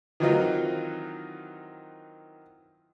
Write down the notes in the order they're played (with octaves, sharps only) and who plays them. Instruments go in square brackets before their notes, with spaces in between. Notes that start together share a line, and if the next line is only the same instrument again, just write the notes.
[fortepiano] D#3 E3 F#3 C4 D#4 F4